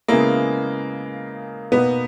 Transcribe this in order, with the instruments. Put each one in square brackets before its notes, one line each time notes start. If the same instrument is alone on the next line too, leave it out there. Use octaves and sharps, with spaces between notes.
[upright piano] C#3 G#3 B3 E4 [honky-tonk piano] A#3
[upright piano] B2 A#3 D#4 [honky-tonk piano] B3